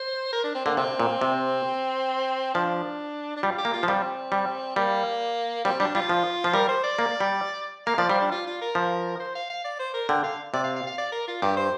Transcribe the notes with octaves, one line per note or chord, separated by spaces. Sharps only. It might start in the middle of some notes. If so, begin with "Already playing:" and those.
Already playing: C5
A#4
D4
C4
D3 A#3
C3 C4
A#2
C3
F3 D4
D4
G3 F4
G4
A#3
F4
F3
G3 C4
G3
G3 A#3
G3 C4
G3 D4
G3 F4
F3
F3
G3 A#4
C5
D5
A#3
G3
A#3 F5
F3 D5
G3 C5
D4
F4
F4
A#4
F3
C5
F5
F5
D5
C5
A#4
D3 G5
F5
C3 D5
F5
F5
F5
D5
A#4
F4
G2 G4
C5